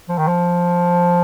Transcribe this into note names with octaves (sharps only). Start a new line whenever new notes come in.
F3
D#3
F3